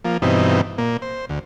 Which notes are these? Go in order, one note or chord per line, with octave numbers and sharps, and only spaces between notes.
F3 A#3
G2 B2 E3 C4 D#4
A#2 A#3
C5
D2